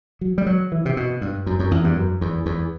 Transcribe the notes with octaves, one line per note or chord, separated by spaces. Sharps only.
F#3
G3
F#3
E3
C3
B2
G2
F#2
F#2
E2
G2
F#2
E2
E2